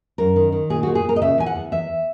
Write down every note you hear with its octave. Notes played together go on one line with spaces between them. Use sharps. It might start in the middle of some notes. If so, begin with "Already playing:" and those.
F#2 A#4
D#3
D#3
A#2 G#4
A#2 F#4
G#4
A#2 A#4
D#5
C#3 E5
E2 G#5
F#5
E2
E2 E5